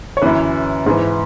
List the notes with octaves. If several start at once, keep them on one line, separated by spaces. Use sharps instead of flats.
C#5
F#2 E3 B4
G#2 E3